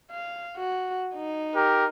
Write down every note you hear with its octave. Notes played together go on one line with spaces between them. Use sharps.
F5
F#4
D#4
G4 A#4